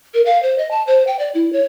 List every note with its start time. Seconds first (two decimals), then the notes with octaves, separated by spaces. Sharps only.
0.14 A#4
0.26 F5
0.43 C5
0.58 D#5
0.71 A5
0.87 C5
1.07 G5
1.19 D5
1.35 E4
1.53 C#5